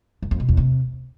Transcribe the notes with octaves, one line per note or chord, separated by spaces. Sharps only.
F#2
F2
B2
E2
C3